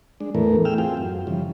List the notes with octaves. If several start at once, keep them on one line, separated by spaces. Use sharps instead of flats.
G#3 D4
E2 A2 E3 A3 B3 A#4
G#4 G5 E6 F6
C4 F4 G#4 G5
F#2
C#3 E3 F3 G3